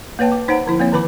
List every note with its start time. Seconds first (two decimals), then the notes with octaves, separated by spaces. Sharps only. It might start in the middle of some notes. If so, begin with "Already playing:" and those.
0.19 A#3 B4 C#5 G5 A5
0.32 D6
0.48 D#4 C5 C#5 F#5 A#5
0.66 D3 F3 E4
0.79 A#3 C4 C#5
0.92 D3 D#3 B4 B5 D6